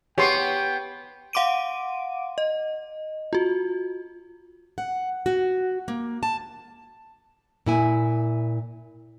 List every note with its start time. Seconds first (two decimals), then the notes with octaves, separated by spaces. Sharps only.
0.18 B3 G4 C#5 G5 C6 C#6
1.33 F5 F#5 C6 D6 D7 D#7
2.38 D#5
3.33 F4 F#4
4.78 F#5
5.26 F#4
5.88 A#3
6.23 A5
7.66 A#2 E4 G#5